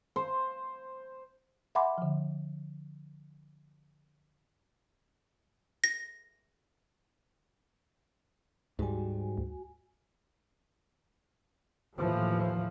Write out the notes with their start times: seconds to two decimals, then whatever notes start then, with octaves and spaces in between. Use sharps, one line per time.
0.16 C5
1.75 E5 F#5 G#5 B5 C6 D6
1.98 D3 F3
5.84 A#6
8.79 D2 G#2 G3 F#4 G#5
9.38 D2
11.97 D#2 A2 E3 F3